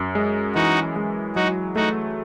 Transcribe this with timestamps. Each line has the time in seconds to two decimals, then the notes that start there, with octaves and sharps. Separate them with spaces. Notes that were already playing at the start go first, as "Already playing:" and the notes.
Already playing: F#2
0.15 G#3
0.55 E3 D#4 F#4
0.96 G#3
1.35 F#3 D#4 F#4
1.76 A3 D#4 F#4